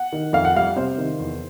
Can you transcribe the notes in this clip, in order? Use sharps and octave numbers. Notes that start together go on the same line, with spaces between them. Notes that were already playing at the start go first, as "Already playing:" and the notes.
Already playing: F#5
D#3
F2 F5
F#5
G3 F5
C3 C5
D#3
E2